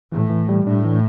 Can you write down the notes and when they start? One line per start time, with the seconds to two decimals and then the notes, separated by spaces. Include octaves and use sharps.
0.12 A2 E3
0.30 E3
0.49 G3
0.67 A2 D4
0.85 E3